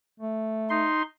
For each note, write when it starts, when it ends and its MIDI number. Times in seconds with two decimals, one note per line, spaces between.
0.20 0.86 57
0.70 1.02 63
0.70 1.02 84